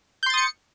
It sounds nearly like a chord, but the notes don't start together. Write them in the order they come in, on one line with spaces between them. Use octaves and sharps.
G6 C6 A6 D#6 C#7